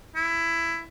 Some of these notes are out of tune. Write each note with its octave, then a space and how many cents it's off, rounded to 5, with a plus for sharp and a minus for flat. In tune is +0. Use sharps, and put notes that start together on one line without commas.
E4 +15